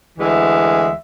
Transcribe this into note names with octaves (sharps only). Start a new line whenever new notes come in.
D2 E3 G#3 E5